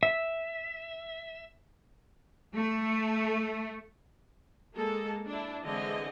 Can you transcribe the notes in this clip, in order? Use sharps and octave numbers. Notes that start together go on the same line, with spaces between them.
E5
A3
G#3 A#3 A4
D4 E4
D3 E3 G#3 C4 D#5 G#5